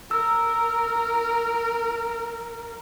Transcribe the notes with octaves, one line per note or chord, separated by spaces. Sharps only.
A#4 E6